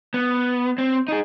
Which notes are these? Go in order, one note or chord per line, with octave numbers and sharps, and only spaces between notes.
B3
C4
D#4 G#4